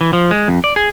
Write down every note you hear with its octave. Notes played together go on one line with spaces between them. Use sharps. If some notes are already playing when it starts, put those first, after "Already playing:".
E3
F3
G#3
F2
D5
G#4